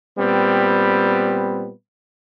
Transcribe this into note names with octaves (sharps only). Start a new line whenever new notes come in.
A#2 G3 B3 C4